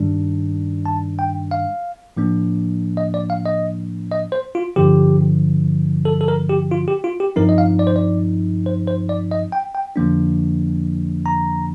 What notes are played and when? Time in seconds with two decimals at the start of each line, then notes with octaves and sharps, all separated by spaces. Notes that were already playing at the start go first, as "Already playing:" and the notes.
Already playing: G2 D#3 G3 D4
0.86 A5
1.19 G5
1.51 F5
2.17 A2 F3 A#3 D4
2.97 D#5
3.14 D5
3.30 F5
3.46 D#5
4.12 D#5
4.32 C5
4.55 F4
4.76 G2 D3 F3 G4
6.05 A4
6.21 A4
6.28 A#4
6.49 G4
6.71 F4
6.88 G4
7.04 F4
7.20 G4
7.36 G2 F3 C4 D#4 A#4
7.49 D#5
7.58 F5
7.79 D5
7.87 C5
7.96 D5
8.66 C5
8.88 C5
9.09 D5
9.31 D#5
9.52 G5
9.75 G5
9.96 F2 D3 F3 A#3 D4
11.26 A#5